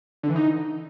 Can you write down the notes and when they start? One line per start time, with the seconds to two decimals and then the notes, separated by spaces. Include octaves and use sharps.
0.23 D3
0.29 E3
0.36 D#4